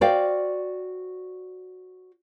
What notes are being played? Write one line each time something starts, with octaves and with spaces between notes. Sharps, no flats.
F#4 C5 D5 F5 G5